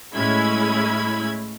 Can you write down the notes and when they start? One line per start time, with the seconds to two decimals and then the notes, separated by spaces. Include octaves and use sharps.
0.14 A2 G#3 C#4 E4 B5 G#6